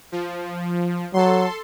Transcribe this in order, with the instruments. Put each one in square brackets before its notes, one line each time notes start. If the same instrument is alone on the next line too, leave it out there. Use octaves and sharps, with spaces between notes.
[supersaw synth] F3
[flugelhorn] F#3 [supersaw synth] A4 C6